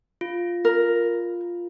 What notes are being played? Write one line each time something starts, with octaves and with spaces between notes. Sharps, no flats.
F4
A#4